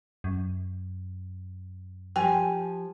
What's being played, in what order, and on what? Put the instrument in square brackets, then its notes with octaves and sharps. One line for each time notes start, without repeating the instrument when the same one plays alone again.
[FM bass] F#2
[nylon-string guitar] F3 G4 G#5 [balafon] G5